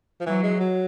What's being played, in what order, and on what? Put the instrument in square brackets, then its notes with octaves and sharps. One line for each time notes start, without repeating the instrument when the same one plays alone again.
[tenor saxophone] F3
[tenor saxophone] E3 [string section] F#3
[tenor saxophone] G#3
F#3